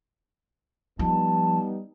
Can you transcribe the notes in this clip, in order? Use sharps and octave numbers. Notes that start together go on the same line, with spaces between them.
F3 G3 B3 D#4 A5